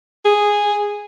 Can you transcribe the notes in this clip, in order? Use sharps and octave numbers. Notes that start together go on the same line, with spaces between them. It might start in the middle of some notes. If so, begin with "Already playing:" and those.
G#4